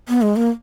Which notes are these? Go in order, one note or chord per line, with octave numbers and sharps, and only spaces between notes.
B3
G#3
A#3